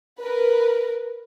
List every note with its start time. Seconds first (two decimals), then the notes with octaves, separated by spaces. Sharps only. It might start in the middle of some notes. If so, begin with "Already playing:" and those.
0.19 A#4 B4